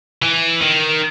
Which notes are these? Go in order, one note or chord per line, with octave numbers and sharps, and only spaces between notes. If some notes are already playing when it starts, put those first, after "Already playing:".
E3
D#3